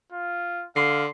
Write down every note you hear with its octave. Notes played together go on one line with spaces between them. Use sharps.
F4
D3 F5 C6 C7